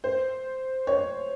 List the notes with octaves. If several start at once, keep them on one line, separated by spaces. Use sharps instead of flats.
C5
C#5